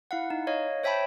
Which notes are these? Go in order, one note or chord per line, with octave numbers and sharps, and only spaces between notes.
E4 F5 F#5
D#4
C#5 D#5 F5
C5 C#5 E5 G5 A5 B5